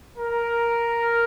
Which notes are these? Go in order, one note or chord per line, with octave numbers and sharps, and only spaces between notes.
A#4